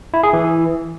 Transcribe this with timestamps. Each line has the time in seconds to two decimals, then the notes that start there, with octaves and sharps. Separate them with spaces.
0.14 E4
0.23 G#4
0.33 E3